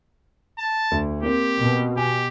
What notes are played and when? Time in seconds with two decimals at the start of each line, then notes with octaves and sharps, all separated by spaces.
0.58 A5
0.91 D2
1.23 A#3 C4 G4
1.58 B2
1.97 G4 G#5